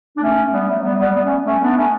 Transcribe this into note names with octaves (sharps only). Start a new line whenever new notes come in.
D4
A3 C#4
G3 B3
F#3 A3
G3 B3
G3 B3
G3 B3
A3 C#4
A3 C#4
B3 D4
A3 C#4